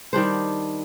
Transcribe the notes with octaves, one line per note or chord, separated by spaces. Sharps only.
D#3 G3 D4 C5